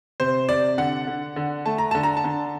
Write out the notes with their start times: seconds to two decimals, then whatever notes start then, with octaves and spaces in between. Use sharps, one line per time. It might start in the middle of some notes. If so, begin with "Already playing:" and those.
0.20 C3 C5
0.49 C3 D5
0.78 D3 F#5
1.07 D3
1.36 D3
1.66 A3 A5
1.78 A#5
1.91 D3 A5
2.03 A#5
2.17 A5
2.24 D3